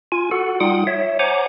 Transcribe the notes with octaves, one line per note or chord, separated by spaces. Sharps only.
F4 G#5
F#4 A4 F#5
G3 D#4 F4 F#5 G5 D#6
C#5 E5
C5 C#5 F#5 G#5 A#5 D6